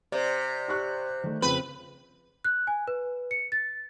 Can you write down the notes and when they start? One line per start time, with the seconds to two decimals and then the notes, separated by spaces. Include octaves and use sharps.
0.12 C3 C5 D5
0.68 G4 C#6 F#6
1.24 D#3 A3
1.42 F2 C#3 C4 B4
2.44 F#6
2.67 G#5
2.88 B4
3.31 C#7
3.52 A6